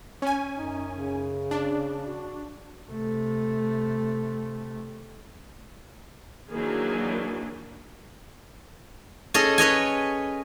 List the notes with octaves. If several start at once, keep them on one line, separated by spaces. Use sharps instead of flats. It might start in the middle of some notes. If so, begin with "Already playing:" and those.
C#4 G#5
F#2 D#4
C#3
D4
F#4
C3 A3
D#3 E3 F#3 A#3 D4 G#4
C#4 G#4 A4 D#5
B4 C#5 D#5 G#5